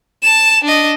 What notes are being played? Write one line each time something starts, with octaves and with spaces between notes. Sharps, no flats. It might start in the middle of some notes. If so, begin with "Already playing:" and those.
A5 E7
D4 D#5